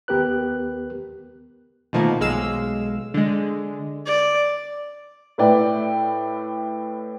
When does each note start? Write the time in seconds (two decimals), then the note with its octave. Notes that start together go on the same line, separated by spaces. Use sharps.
0.08 D#2 B3 G4 A#4 B4 F#6
1.93 B2 D#3 F3 A3 A#3
2.20 B1 G#3 F5 E6
3.14 D3 G#3
4.06 D5
5.38 A2 E4 B4 D5 G5